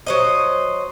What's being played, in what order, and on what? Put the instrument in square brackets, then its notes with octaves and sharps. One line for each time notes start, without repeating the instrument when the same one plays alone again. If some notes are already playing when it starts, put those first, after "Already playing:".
[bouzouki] F#3 C5 D#5